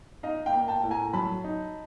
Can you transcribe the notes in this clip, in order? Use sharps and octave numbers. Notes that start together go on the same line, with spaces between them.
D#4 D#5 F5
F5 G5
A#3
G5 A5
A2
G#5 A#5
F#3 A5 B5
D#4